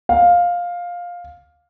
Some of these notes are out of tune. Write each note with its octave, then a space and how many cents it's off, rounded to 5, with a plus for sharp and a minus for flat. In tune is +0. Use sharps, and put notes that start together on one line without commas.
F5 +10